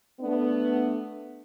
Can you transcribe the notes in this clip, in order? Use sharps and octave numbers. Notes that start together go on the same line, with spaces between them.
A3 B3 D4